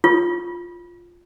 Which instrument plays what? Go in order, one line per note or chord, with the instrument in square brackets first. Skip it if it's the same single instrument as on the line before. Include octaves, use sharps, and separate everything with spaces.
[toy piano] F4